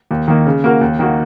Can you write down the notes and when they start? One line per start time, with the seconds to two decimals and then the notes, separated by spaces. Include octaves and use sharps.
0.11 D#2
0.28 D#3 A#3
0.46 C#3
0.64 A#3 F#4 A#4
0.81 D#2
0.99 D#3 A#3 F#4